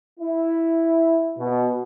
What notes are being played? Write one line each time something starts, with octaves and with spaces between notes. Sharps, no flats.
E4
B2